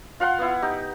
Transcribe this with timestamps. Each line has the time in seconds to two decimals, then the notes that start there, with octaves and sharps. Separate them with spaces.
0.20 F4 F5 F#5 C6
0.39 B3 E4
0.62 D#4 G4